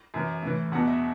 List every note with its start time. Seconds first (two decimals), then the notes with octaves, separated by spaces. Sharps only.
0.14 F#2 E3
0.42 A2 E3
0.72 E2 B2 F#5
0.87 E5